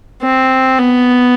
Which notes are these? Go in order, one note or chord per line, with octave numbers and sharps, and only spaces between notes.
C4
B3